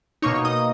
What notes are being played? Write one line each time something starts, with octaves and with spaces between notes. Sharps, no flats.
B2 A#3 D#4 C#5 C#6
D#5 D#6